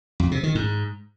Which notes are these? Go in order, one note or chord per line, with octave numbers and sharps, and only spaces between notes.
F2
C3
D#3
G#2